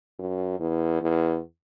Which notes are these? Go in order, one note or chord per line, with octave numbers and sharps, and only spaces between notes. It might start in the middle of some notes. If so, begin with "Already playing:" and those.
F#2
E2
E2